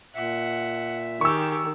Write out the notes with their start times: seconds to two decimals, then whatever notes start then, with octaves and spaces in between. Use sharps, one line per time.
0.15 A#2 E5 F#5
1.21 D#3 G4 G#4 C#6 E6